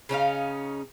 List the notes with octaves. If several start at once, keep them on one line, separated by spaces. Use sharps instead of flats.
C#3 C#4 D#4 F5